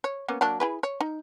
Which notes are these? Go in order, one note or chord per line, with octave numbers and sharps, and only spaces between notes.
C#5
A#3 B3 C#4
F#3 A#3 D4
E4 G#4 B4
C#5
D#4